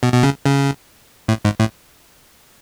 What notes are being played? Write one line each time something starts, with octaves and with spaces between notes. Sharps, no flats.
B2
B2
C#3
C#3
A2
G#2
A2